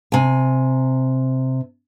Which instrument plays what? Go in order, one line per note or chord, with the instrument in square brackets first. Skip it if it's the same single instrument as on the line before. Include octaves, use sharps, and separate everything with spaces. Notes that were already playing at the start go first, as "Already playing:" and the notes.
[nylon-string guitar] C3 G#5